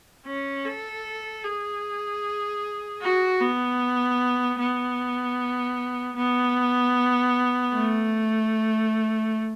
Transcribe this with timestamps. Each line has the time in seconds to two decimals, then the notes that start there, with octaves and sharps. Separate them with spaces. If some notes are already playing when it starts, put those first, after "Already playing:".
0.26 C#4
0.65 A4
1.44 G#4
3.02 F#4
3.40 B3
4.59 B3
6.16 B3
7.74 A3